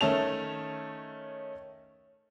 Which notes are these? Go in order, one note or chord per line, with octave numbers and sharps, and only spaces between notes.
D#3 A3 C#4 A5 F7